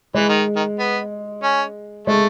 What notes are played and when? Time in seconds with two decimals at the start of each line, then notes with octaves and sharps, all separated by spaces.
0.15 E3 G#3
0.29 D#3
0.56 D#3
0.79 B3
1.43 C#4
2.07 G#3 A3